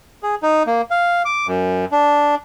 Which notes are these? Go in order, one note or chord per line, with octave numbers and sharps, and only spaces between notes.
G#4
D#4
A#3
F5
D6
F#2
D4